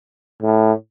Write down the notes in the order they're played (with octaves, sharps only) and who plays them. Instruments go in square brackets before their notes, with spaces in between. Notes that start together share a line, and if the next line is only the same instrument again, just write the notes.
[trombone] A2